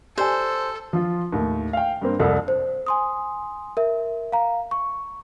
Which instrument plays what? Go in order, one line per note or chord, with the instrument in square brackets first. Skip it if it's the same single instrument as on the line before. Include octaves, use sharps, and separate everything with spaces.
[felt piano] G4 D5 G#5 [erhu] A4 [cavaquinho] C5
[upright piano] F3 F4
D#2 A2
F5 G5
G2 A#3 C4
C2 F2 A4
[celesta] C5
G#5 C6 D#6
A#4 E5
F5 A#5
C#6